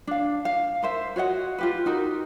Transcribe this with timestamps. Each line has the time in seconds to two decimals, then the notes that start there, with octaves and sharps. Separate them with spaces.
0.07 D4 F5
0.45 F5
0.82 A#4 C5 E5
1.16 F#4 C#5 D#5 F#5
1.58 F4 G4 B4
1.86 D#4 F#4 A#4